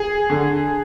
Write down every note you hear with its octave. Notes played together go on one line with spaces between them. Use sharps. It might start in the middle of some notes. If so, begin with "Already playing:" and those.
Already playing: G#4
D3